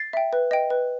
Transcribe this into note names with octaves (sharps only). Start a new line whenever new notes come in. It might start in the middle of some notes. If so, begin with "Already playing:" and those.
Already playing: A6 C7
E5 G5
B4
D#5 G5
B4